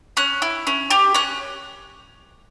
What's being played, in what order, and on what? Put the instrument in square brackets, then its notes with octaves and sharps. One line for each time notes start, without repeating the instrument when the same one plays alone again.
[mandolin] C#4 F#6
E4
C#4
G4
C#4 F#6